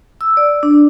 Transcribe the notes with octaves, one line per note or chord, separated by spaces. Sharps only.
E6
D5
D4